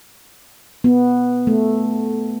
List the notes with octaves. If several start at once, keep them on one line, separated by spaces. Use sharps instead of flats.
B3
A3